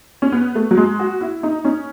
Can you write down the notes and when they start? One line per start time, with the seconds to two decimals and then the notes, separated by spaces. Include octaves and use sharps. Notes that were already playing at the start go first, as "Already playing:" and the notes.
0.22 C#4
0.32 B3
0.55 A3
0.71 F#3
0.77 G#3
0.99 F#4
1.21 E4
1.43 D#4
1.65 C#4